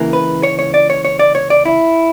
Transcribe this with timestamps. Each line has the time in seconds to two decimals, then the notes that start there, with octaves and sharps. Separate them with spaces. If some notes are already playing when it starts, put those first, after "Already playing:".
Already playing: C#2 C#3 E3 A#3
0.13 B4
0.43 C#5
0.59 C#5
0.74 D5
0.90 C#5
1.05 C#5
1.19 D5
1.35 C#5
1.50 D5
1.65 E4